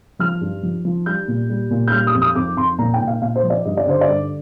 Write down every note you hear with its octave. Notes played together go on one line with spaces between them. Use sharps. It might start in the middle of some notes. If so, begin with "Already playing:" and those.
F3 F6
G2
F3
F3
G3 G6
A#2
G3
A#2
G6
G3 F6
D#6
F2
D#6
F2 D6
F2 C6
A#2 A#5
G5
A#2
F5
A#2 F5
C5
F3
D5
G2 D#5
D5
D3 C5
D5
G2